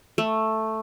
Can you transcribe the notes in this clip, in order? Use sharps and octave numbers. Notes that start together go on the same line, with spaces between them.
A3